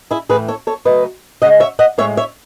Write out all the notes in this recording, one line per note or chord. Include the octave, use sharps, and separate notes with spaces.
E4 G#4
A2 E3 A3 G#4 B4
A4 C#5
A4 C#5
C#3 F#3 A3 B4 D#5
C#3 G#3 D#5 F#5
C#5 E5
D#5 F#5
A2 G#3 C#5 E5
C#5 E5